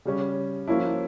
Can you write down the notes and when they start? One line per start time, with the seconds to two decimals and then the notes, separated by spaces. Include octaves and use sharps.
0.05 C#3 G3 C#4
0.67 F3 A#3 C#4 E4